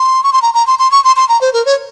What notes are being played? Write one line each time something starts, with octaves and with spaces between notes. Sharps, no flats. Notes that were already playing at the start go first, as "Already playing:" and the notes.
Already playing: C6
C#6
C6
A#5
A#5
C6
C6
C#6
C6
C6
A#5
C5
A#4
C#5